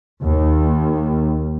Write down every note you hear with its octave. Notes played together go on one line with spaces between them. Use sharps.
D#2